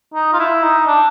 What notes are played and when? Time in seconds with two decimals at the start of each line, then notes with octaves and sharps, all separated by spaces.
0.14 D#4
0.33 F4
0.39 E4
0.63 D#4
0.87 D4